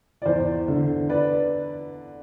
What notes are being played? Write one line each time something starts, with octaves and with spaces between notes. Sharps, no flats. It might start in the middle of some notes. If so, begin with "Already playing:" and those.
D5
E2 C5
D3
B4 D5